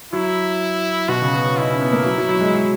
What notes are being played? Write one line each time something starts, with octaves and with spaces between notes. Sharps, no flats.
F#3 E4
B2 F#4
C#3
B3
C#4
D#4 E4
C#4
B3
A#3
F#3
F#3
F#3
G#3
F#3